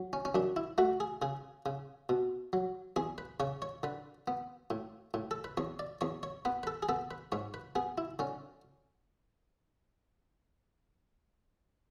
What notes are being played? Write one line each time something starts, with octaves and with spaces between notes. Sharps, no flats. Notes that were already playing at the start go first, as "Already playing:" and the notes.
Already playing: F#3
C#4
C#4
F#2 D4
E4
A3 F#4
G#4
C#3 G#4
C#3
B2
F#3
E2 G#4
B4
C#3 C#5
C#5
D3 B4
B3
A2
A2
A4
B4
E2 C#5
D5
E2 C#5
C#5
B3 B4
B4
A4
G#4
B3 A4
B4
G#2 C#5
B4
B3 G#4
E4
D3 C#4